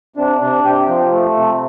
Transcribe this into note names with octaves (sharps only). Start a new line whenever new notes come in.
C3 D4
C3 D4
C3 G4
F3
A3
C3